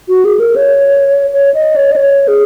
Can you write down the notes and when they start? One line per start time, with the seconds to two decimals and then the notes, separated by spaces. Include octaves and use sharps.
0.09 F#4
0.25 G#4
0.39 A#4
0.56 C#5
1.34 C#5
1.54 D#5
1.76 C#5
1.92 D#5
1.96 C#5
2.28 G#4